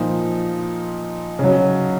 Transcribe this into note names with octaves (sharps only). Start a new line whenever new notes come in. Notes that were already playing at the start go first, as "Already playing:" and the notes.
Already playing: A#2 F3 D#4
C#3 F#3